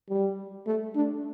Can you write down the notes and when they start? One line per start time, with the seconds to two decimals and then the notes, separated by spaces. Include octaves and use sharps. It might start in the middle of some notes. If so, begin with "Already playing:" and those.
0.09 G3
0.67 A3
0.95 D4